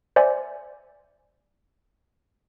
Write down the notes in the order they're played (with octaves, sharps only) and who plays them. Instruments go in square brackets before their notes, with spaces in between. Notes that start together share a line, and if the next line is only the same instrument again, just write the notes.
[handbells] C5 D5 E5 G#5